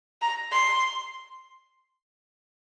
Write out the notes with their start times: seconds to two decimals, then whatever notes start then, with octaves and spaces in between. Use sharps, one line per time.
0.21 A#5
0.52 C6